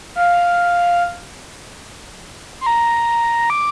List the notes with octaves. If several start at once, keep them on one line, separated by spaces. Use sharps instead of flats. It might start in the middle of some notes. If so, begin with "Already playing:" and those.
F5
C6
A#5
D6